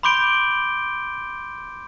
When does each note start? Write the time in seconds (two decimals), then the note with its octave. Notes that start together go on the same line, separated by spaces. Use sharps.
0.03 B5 C6 D6 G6 D7 G7